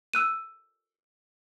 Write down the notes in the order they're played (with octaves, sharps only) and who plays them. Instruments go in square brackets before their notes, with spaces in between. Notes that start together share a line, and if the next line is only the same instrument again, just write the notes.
[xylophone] E6 F#6 D#7